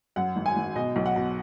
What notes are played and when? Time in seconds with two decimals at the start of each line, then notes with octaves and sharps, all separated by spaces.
0.16 F#2 F#5
0.36 G#1
0.46 G#5
0.56 G#1
0.76 B2 D#5
0.96 B1
1.06 F#5
1.16 B2